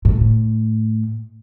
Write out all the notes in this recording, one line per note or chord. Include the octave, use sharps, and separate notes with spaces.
A2